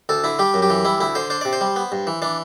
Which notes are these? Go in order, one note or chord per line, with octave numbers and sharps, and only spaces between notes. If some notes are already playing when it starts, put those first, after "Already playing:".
D2 A4
D3 E4
G3 G4
F#2
G4
E3
G3 E4
D2 E4
D3 C5
D4 C5
C3 D5
C5
G3
B3
G2
E3
E3 D4